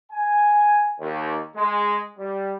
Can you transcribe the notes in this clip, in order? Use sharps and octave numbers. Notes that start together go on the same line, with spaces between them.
G#5
D#2
G#3
G3